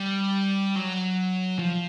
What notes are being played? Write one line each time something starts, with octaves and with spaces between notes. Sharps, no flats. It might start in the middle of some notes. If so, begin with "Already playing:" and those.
Already playing: G3
F#3
F3